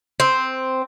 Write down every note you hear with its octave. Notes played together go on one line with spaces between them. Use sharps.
C4